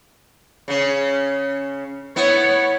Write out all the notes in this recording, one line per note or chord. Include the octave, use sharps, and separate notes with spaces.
C#3 C#4
B3 E4 C#5